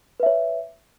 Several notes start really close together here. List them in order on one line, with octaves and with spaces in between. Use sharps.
B4 E5 C#5